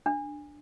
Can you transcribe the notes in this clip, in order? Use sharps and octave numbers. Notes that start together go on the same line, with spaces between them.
D4